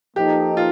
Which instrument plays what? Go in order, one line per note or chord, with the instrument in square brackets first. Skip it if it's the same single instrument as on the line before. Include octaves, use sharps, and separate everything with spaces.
[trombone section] F3 A#3 D#4 A4 [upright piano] G4
[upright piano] F4